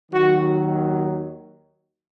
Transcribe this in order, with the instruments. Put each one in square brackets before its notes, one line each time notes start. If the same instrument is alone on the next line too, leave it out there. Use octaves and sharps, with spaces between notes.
[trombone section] D#2 D#3 F#3 F#4